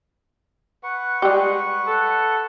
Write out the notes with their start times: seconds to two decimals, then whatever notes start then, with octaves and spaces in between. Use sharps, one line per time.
0.83 B4 F#5 C#6
1.22 G3 G#3 G4
1.87 A4